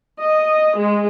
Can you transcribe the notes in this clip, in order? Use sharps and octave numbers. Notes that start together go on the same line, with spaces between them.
D#5
G#3